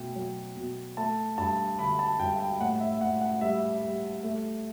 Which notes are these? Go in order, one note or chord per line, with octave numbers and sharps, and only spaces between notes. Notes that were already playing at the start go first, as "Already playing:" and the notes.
Already playing: B2 A3 G5
F#3
B2
A3 A5
G2 A5
D3 B5
A5
G2 G5
G5
A2 F#5
E5
A2 F#5
F#5
G3 E5
G3
A3